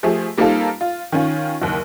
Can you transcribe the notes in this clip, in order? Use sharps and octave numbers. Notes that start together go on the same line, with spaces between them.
F3 A3 G4 G#4
G3 A#3 C4 D#4 F4 A4
F4
D#3 C#4 F4
F#1 D#2